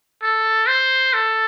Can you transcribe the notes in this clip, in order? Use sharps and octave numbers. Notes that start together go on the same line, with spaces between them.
A4
C5
A4